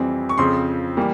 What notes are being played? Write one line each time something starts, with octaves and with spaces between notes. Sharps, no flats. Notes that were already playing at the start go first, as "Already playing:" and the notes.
Already playing: F2 E3 G3 C4
C#6
F2 C#3 F3 C4 C6
E3 G3 A#3